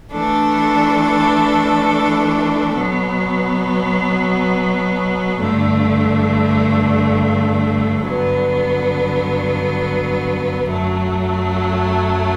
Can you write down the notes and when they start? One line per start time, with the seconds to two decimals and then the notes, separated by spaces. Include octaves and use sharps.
0.12 E3 A3 D4 A4
2.75 B2 F#3 B3
5.39 G2 D3 A3
8.02 G2 D3 F#3 B3
10.66 F#2 F#3 A3